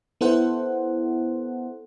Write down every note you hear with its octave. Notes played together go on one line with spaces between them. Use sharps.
B3 E4 A4 C5 F#5